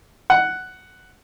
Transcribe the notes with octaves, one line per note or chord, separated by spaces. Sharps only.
F#5